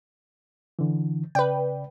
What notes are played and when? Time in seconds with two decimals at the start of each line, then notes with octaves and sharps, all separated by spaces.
0.79 D3 E3
1.35 C#3 B4 D5 G5